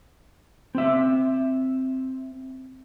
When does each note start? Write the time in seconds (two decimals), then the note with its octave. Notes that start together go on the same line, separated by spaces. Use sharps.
0.75 C4 E5